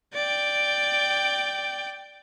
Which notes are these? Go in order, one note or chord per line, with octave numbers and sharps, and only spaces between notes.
D5 G5